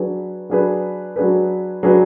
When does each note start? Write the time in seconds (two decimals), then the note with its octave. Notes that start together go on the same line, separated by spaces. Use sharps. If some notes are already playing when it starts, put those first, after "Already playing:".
Already playing: F#3 D4 G#4 B4
0.50 F#3 D4 G#4 B4
1.16 F#3 D4 G#4 B4
1.83 F#3 D4 G#4 B4